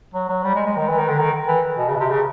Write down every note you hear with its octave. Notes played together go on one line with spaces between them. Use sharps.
F#3
F#3
G3
G#3
G#3
D#3
E3
D#3
D3
D#3
E3
B2
C#3
B2
C3
C#3